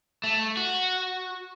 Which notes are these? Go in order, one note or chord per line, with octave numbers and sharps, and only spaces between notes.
A3
F#4